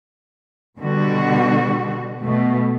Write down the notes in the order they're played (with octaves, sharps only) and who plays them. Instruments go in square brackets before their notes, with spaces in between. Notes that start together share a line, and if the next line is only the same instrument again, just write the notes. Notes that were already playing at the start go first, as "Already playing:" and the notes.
[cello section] B2 D3 G3 F#4
B2 A3